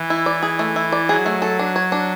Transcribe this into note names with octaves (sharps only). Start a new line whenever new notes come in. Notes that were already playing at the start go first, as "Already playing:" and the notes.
Already playing: E3
E4
D5
G#4
A3
E4
D5
F#3 G#4
A3
A4
D4
C#5
D4